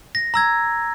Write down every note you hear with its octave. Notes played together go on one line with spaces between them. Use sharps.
A#6
A#5 E6 G#6